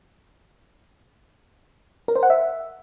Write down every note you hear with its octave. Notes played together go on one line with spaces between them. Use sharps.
A#4
C5
F#5
E5